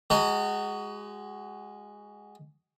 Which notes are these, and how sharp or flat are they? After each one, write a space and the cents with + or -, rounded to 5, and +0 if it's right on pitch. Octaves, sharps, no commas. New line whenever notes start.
G#3 -5 F#4 +25 A#5 -35